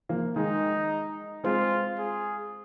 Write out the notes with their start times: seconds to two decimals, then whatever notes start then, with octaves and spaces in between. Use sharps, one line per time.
0.09 F3 A#3
0.36 D#3 G#3 D#4
1.44 G#3 C4 F4
1.98 G#4